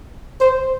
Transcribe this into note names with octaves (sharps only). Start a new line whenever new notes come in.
C5